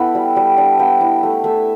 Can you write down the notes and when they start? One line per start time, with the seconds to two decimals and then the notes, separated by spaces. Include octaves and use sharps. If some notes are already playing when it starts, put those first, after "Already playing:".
Already playing: B3 E4 G4 A4 E5
0.15 G3
0.36 G3
0.58 D4
0.79 B3 G5
1.01 E4
1.23 A3
1.44 A3 E5